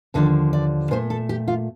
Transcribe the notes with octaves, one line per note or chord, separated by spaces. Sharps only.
D#2 D3 F3 A4
D5
A#2 A3 C5
A4
G4
F4